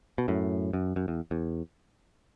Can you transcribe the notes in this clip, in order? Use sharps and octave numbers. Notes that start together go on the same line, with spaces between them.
B2
F#2 A2
F#2
F#2
E2
E2